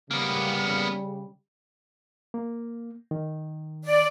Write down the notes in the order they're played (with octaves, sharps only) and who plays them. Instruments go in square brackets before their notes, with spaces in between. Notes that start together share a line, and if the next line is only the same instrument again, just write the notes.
[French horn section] C#3 G3 [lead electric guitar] A#3 B3
[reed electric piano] A#3
D#3
[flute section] D5